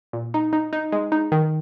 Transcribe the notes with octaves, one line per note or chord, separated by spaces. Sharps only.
A#2
D#4
D#4
D#4
G#3
D#4
D#3